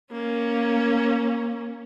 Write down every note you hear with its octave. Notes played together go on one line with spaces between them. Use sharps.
A#3 C#4